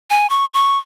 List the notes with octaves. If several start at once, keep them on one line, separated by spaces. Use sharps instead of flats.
G#5
C#6
C#6